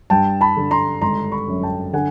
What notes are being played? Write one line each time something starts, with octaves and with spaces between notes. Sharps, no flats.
G2 G5 A5
A5 B5
D3
A#5 C6
G#1 A#5 C6
B5 C#6
F#2
G5 A5
D3 F#5 G#5